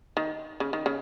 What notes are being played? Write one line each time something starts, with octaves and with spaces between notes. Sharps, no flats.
D#3
C#3
D#3
C#3